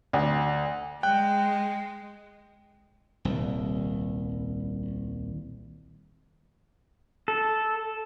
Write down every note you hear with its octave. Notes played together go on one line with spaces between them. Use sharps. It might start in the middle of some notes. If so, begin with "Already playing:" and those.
D2
G#3 G5 F#6
D#1 C2
A4